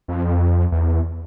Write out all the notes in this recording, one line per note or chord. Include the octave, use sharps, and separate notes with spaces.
F2
E2